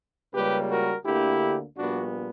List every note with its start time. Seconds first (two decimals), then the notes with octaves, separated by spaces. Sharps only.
0.33 C#2 C#3 G3 A#3 G4 B4
0.69 F#4 A#4
1.05 D2 D3 A#3 E4 G4
1.77 A#1 A#2 G3 B3 D4 F#4